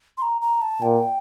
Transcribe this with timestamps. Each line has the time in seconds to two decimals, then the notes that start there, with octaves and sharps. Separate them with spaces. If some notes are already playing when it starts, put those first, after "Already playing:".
0.18 C6
0.22 A#5
0.41 A#5
0.62 A5
0.82 A#2 G5